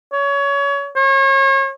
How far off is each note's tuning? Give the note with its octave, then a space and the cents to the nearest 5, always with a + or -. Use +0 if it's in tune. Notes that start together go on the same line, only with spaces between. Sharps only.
C#5 +25
C#5 -35